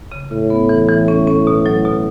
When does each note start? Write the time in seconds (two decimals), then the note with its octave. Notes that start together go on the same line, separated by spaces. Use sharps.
0.12 C#3
0.31 A2 C#3
0.50 B3
0.69 E3
0.88 E3
1.08 C#4
1.27 C#4
1.47 B2
1.66 F#3
1.85 B2